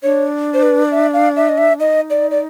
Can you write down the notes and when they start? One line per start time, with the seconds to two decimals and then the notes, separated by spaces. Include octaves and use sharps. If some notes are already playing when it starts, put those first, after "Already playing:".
0.03 D4 C#5
0.54 C5
0.62 B4
0.91 E5
1.13 F5
1.36 E5
1.49 D#5
1.58 E5
1.79 D#4 D#5
2.10 D5
2.31 D5